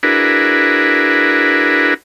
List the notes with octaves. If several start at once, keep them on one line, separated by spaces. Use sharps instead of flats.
D4 E4 F#4 G#4 A#4 B4